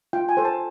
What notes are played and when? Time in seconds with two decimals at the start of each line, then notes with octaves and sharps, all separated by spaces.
0.13 F4 G5
0.29 G#5
0.37 A4 C5
0.45 A5